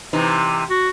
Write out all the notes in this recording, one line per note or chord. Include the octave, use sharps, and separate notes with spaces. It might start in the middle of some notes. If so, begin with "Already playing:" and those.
C3 E3 D#4
F#4